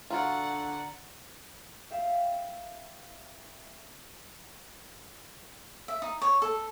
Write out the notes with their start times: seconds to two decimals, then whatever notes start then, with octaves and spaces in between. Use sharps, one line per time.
0.10 D3 F4 F#4 D5 F#5 A#5 A6
1.90 E5 F5 G5
5.88 E5
6.02 D#4
6.22 C#5
6.42 A4